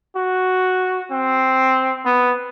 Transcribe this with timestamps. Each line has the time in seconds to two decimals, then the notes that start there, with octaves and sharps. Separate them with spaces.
0.16 F#4
1.11 C4
2.05 B3